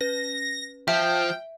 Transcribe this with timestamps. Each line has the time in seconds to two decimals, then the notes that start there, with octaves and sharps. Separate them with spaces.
0.01 C#4 B4 A#6
0.88 F3 E5 G5